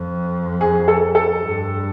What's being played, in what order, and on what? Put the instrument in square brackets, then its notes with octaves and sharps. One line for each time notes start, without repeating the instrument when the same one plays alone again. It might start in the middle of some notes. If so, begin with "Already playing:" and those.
Already playing: [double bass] F2
[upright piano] G#4
A4
A4
[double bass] G2